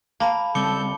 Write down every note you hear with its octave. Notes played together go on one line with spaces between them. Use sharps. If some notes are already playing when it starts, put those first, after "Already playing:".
A#3 A5 B5
C#3 G3 C4 A4 D6 G6 C#7 G7